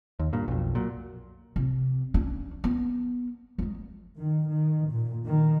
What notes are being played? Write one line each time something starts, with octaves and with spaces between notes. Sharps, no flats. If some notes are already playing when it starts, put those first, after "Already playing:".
D#2
G2 A#2
B1 F2
A#2 F#3
C3
C#4 D4
B3
F#3 G#3
D#3
D#3
A#2
D#3